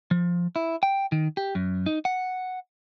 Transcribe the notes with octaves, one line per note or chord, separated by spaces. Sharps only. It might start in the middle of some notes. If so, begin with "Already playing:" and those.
F3
E4
G5
D#3
G4
F#2
D#4
F#5